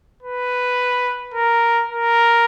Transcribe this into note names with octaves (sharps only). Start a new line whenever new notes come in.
B4
A#4
A#4